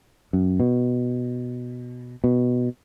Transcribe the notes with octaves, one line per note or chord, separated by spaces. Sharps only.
F#2
B2
B2